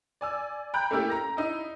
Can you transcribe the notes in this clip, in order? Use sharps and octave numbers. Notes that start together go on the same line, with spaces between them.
D5 G#5 E6
G5 A#5 B5 F#6 G6
A3 A#3 C#4 E4 G4
A#5 A#6
D#4 E4